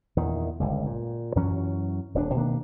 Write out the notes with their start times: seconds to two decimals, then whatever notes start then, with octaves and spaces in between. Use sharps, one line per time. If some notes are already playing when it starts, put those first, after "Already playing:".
0.17 E2 A#2 D#3
0.60 G1 C#2
0.86 A#2
1.36 F#2 E3 F#3 C#4
2.14 D#1 D2 B3 D4
2.34 B2 D#3 A#3 D4